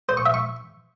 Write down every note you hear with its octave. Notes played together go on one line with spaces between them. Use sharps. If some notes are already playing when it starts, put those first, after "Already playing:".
C5
C#6
E5
C#6